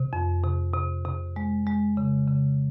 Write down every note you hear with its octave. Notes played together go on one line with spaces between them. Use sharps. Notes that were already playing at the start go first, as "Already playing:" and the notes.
Already playing: C3
F2
C3
C3
C3
G#3
G#3
C#3
C#3